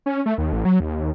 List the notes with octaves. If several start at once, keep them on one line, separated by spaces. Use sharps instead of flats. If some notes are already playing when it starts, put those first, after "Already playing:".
C#4
A3
D#2
A1
F#3
D#2